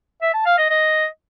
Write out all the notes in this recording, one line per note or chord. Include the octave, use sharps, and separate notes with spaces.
E5
A5
F5
D#5
D#5